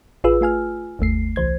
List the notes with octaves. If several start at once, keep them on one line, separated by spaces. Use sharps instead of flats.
A1 F4 G#4 B4 E6
A3 F4 G#5 F6
G1 D#2 A3 C7
C2 E3 C5 G#6